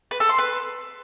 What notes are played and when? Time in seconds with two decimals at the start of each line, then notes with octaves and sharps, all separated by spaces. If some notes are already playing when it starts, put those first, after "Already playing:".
0.11 B4
0.20 A4
0.29 C6
0.38 B4